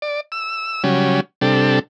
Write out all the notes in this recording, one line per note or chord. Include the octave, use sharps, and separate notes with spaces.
D5
E6
C#3 F#3 G3 C#4
C3 G3 D4 A4